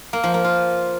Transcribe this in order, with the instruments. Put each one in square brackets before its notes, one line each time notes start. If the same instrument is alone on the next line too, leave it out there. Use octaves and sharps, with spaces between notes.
[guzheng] A#3
F3
A#3
F4